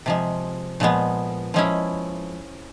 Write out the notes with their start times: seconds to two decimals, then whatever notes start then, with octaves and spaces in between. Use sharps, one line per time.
0.06 C3 F3 G#3
0.80 A#2 F3 G#3 B3
1.54 F3 G#3 C#4 E4